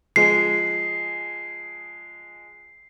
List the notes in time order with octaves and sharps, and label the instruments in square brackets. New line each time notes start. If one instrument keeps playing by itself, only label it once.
[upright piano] F3 G#3 G#4 [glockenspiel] C7